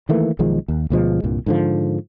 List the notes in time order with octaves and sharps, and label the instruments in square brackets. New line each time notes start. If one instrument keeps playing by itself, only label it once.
[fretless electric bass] D#3 E3 A3 A#3
B1 D#3 F3 G#3
D#2
D2 B2 F3 G#3
C2 G2 A#2
G#2 D3 F3